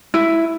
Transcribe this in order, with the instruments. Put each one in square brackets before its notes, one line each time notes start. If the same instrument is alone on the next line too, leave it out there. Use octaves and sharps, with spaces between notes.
[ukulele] E4